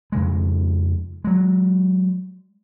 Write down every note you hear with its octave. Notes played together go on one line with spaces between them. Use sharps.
F2 C#3 G#3
F#3 G#3